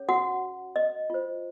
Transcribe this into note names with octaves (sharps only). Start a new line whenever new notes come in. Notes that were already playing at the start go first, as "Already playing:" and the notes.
Already playing: C#4 G#4 C#5
F#4 F#5
D#5
F4 C5